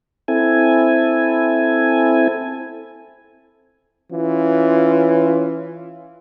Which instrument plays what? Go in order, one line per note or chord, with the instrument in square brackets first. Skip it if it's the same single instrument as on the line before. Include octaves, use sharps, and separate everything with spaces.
[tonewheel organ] C4 E4 A4 G#5
[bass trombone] E3 [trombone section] C#4 F4